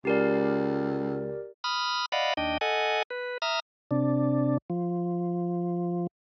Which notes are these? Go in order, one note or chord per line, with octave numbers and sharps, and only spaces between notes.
C#2 G4 A#4 D5
B5 D#6 F6
D5 D#5 F5 F#5 B5
D#2 D4 D#5 G5
A4 D#5 F#5 G#5
B4
E5 A#5 D#6 F6
C3 D4
F3